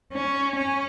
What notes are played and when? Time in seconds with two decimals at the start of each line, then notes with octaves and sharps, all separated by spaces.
0.13 C#4
0.56 C#4